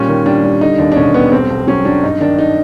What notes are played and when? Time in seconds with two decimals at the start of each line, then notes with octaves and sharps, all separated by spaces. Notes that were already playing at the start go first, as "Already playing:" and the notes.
Already playing: A#2 G3 C#4
0.09 D#3
0.26 G3 D4
0.43 G3
0.61 D3 D#4
0.78 D#2 D4
0.92 D4
0.96 E1 C#4
1.14 G3 B3
1.32 B1 C4
1.50 B1
1.67 F#3 C#4
1.85 F#3 D4
2.03 G2 D#4
2.20 D#3 D4
2.39 D#4